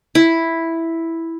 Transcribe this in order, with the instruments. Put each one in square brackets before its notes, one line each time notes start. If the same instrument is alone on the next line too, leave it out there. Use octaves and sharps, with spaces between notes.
[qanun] E4